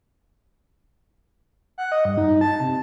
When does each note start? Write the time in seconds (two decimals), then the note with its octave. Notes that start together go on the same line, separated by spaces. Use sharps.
1.78 F#5
1.92 D#5
2.05 G2
2.18 D#4
2.41 A5
2.60 C3